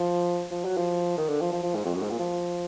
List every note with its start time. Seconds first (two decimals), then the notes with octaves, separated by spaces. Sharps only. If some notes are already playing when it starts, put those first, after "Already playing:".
Already playing: F3
0.51 F3
0.65 F#3
0.77 F3
1.17 D#3
1.29 D3
1.41 F3
1.52 F3
1.63 F3
1.75 G#2
1.85 F2
1.94 F#2
2.02 G#2
2.10 A#2
2.19 F3